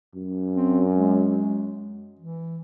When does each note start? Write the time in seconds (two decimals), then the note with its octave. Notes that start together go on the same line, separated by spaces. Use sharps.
0.15 F#2
0.55 C4
0.96 G#3
2.19 E3